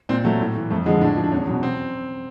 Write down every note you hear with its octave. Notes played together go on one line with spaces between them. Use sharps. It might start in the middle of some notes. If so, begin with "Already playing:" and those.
A#2 C4
F#3 A3
A2
E3
F2 A3
D3 F3 G#3
A2 D4
F3
D4
E2 C#4
B2 F#3
C4